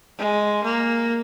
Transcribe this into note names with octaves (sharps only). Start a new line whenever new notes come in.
G#3
A#3